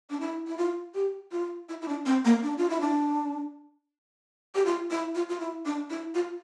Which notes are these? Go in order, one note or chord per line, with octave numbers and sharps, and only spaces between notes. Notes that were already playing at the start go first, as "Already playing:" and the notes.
D4
E4
E4
F4
G4
F4
E4
E4
D4
C4
A#3
D4
F4
E4
D4
G4
F4
E4
F4
F4
E4
D4
E4
F4